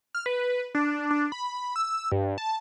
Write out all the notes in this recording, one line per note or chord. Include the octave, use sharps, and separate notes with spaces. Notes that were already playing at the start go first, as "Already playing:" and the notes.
F6
B4
D4
D4
B5
E6
G2
A5